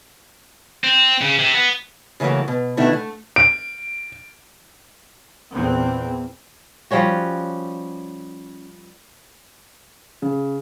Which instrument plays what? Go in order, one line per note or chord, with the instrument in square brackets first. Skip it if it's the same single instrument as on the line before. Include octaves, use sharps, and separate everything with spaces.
[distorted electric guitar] C4
C#3
C3
B3
[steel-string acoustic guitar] C#3 E3 F#3 A3 A#3
B2
B2 D#3 A3 D4 E4 F#4
A3
[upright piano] D7
[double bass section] E2 A#2 C4
[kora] F3 G3 C#4 F#4
[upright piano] C#3